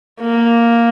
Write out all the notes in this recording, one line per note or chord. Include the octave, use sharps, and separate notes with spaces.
A#3